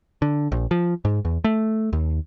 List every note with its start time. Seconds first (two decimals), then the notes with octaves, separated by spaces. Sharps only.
0.22 D3
0.52 A#1
0.71 F3
1.05 G#2
1.25 E2
1.44 A3
1.93 D#2